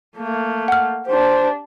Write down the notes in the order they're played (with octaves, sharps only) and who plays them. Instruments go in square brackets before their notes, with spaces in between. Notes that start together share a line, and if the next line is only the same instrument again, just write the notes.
[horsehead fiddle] A3 A#3
[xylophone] F#5 F6
[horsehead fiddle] D4 G4 [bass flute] C5